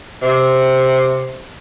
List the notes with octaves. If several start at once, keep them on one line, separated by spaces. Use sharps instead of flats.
C3